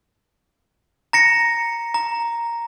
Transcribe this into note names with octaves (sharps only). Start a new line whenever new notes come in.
A#5 A#6 C#7
A#5